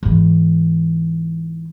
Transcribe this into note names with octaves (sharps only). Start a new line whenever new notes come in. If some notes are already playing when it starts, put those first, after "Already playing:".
G#2 E3